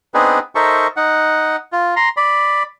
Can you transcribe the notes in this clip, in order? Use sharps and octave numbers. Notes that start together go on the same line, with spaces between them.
B3 C4 D4 D#4 G#4 B4
D#4 A4 A#4 C5 E5 C#6
D#4 F#5
F4
A#5 C6
D5 B5